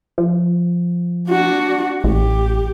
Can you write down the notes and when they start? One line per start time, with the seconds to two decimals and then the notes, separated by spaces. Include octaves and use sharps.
0.18 F3
1.29 D4 F#4
2.04 A1 G4